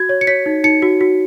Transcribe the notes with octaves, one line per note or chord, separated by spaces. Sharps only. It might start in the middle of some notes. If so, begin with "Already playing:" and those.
Already playing: F#4 G#6
C#5
C#7
C#5 B6
D#4
D#4 C#7
F#4
F#4